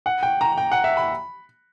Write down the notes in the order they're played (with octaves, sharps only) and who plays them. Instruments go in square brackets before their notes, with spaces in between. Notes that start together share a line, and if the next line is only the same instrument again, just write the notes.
[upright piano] F#5
G5
A#5
G5
F#5
E5
B5